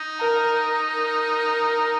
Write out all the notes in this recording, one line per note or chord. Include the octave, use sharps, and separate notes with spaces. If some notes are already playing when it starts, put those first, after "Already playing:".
Already playing: D#4
A#4
A#4